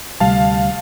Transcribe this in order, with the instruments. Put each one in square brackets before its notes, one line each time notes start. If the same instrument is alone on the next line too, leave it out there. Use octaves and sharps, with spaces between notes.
[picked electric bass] D2 C3 G3 [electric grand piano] F5 A5